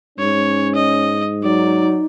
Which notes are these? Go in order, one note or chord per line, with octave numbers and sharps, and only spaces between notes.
G#2 C#4 C#5
D#5
F#3 D#4 D5